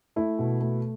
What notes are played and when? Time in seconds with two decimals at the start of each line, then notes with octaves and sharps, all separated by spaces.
0.16 A3 E4
0.39 B2
0.61 A3